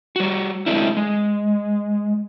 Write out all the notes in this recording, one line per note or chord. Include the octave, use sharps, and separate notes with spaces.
G3 F#4
G#3 A3 C4 D4 E4
G#3